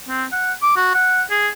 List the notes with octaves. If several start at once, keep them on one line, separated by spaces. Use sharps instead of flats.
C4
F#5
D6
F#4
F#5
G#4